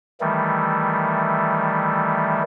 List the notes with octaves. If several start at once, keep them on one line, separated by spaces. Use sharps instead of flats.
D#3 E3 G3 A3